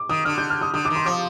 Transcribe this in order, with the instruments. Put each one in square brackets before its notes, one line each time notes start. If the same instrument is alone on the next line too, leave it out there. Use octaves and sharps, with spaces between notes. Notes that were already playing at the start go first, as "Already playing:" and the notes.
Already playing: [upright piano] D6
[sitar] D#3 [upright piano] D#6
[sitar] D3 [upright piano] F6
[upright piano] G6
F6
D#6
[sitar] D3 [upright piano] D#6
[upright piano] D6
[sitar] D#3
[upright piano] C6
[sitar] F3 [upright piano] D6